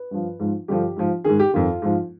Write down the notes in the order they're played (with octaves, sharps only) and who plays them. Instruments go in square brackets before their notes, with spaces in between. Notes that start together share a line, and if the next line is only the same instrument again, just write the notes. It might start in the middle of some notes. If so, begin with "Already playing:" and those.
Already playing: [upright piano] B4
G2 F3
G#2 F3
G2 D3 F3 G4
G#2 F3
G#2 D#3 G#4
G4
F2 D#3 F4
G#2 F3